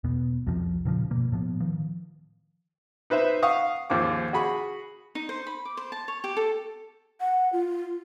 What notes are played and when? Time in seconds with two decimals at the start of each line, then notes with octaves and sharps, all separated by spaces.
0.04 E2 B2 B3
0.46 C2 F2 C3 F3
0.85 E1 A#2 C#3 F3
1.11 G1 B2 A#3
1.32 A2 F3 B3
1.60 D#3 F3
3.10 D#4 B4 C5 E5
3.43 F5 F#5 C#6 D#6
3.90 D#2 G#2 F3 D6
4.33 F#4 G#4 B5 C#6
5.15 D#4
5.29 C5
5.47 B5
5.65 D6
5.77 C5
5.92 A5
6.08 C#5
6.24 G4
6.37 A4
7.21 F#5
7.53 F4